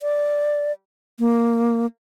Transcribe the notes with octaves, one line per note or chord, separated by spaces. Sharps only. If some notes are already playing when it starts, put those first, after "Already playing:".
D5
A#3